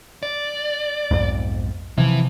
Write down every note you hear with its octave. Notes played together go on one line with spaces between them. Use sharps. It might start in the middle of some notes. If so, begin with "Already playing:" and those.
D5
B1 F2 G#2
C3 E3 F3